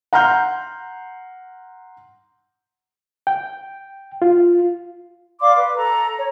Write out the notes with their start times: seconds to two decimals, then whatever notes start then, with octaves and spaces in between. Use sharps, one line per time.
0.13 F#5 A#5 C6 F6 G6
3.27 G5
4.22 F4
5.41 D5 F5 C6 D6
5.54 B4
5.75 A4 A#5
6.17 C#5